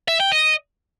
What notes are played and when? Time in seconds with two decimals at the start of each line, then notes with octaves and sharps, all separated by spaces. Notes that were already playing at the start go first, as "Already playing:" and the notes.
0.08 E5
0.20 G5
0.32 D#5